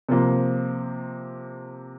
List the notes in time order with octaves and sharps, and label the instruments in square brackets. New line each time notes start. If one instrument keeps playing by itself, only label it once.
[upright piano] C3 F3 A#3